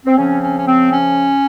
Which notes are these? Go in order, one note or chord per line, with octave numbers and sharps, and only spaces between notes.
C4
C#3 F3 C4 C#4
C#4
C#4
C4
C#4